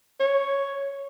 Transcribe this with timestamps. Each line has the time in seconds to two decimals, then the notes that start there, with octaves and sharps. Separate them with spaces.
0.20 C#5